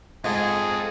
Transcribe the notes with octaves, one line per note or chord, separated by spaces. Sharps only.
G#2 F4 G#4 A4